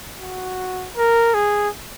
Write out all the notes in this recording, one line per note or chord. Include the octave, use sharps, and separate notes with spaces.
F#4
A#4
G#4